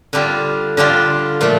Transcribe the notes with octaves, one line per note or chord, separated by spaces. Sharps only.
D3 G3 D4 F4
D3 G3 D4 F4
A#2 F3 A3